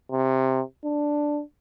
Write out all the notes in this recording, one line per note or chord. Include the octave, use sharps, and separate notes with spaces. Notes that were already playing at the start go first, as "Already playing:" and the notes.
C3
D4